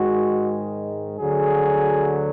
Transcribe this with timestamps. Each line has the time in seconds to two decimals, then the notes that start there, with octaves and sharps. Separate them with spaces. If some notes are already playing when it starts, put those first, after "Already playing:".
Already playing: G#2 D#3 G#3 F#4
1.18 D2 D3 F#3 G#4